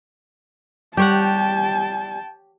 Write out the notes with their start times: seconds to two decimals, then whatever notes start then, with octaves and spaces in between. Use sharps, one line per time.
0.97 G3 G4 C#5 F#5 G5 A5